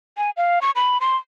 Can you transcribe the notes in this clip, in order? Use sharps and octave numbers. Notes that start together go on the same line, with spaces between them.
G#5
F5
C#6
B5
C6